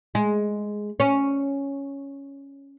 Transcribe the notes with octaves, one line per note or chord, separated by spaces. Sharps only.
G#3
C#4